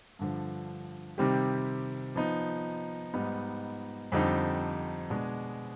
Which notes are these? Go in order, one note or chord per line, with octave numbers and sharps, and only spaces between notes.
G2 D3 F3
C3 D#3 G3 C4 G4
F3 B3 D#4
G#2 G3 B3 D#4
F2 D3 G3 C4 D#4
B2 G#3 D4 G#4